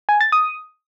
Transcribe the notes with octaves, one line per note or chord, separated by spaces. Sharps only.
G#5
A6
D#6